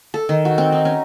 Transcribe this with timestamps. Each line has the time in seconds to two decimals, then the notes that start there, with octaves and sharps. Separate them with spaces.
0.14 A4
0.29 D#3
0.45 F#4
0.58 C4
0.72 D#4
0.85 C#4